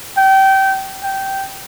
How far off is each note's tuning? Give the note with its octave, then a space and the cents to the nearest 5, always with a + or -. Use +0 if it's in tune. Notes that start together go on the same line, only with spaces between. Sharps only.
G5 -25
G5 -15